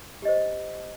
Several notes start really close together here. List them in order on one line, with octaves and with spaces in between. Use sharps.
G4 D#5 C5